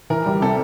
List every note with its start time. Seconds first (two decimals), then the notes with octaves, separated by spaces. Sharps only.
0.10 E3 A#4
0.26 G3
0.42 C3 A4